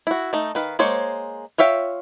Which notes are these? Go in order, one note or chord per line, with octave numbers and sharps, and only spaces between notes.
E4 F#4
A3 D#4
D#3 B4 F5
G#3 A#3 C5 C#5
F4 C#5 E5 F5 G5